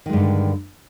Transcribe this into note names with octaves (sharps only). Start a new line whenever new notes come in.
G2 D3 D#3 G#3